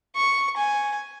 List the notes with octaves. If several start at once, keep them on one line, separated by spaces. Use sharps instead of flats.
C#6
G#5